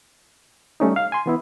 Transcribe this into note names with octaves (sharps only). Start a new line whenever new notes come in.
G3 A3 C#4 D#4
F5
G#5 C6
E3 B3 E4